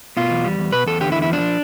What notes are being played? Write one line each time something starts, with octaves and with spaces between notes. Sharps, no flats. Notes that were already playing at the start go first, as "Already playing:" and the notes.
B2 F4
E2
G3
E2
B2 B4
E2 A4
D3 G4
E4
E2
E4
F3 D4